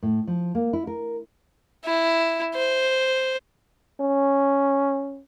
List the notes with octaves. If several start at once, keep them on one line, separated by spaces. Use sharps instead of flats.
A2
F3
A#3
E4
A#4
E4
C5
C#4